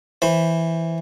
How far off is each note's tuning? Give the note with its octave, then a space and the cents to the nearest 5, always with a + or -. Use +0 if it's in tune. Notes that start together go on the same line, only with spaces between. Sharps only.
E3 +0 C5 +0 B5 +0